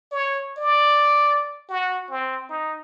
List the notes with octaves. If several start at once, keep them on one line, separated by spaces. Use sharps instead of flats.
C#5
D5
F#4
C4
D#4